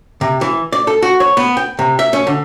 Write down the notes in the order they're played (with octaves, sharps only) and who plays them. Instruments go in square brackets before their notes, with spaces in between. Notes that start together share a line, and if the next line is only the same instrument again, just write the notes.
[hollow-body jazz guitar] C3
E3
D5
A4
F#4
C#5
B3
G5
C3
E5
C#4
D3